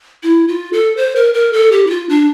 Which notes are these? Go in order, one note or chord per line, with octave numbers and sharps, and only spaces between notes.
E4
F4
A4
C5
A#4
A#4
A4
G4
E4
F4
D4